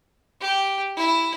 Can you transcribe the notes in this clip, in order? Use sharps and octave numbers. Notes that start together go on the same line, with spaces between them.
G4
E4